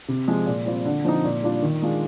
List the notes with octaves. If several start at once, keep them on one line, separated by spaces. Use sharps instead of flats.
C3
F3 G#3
A#2
G3 C4 F4
D3
F3 C4 D#4
A#2
G3 D4 F4
D#3
G#3 D4 F4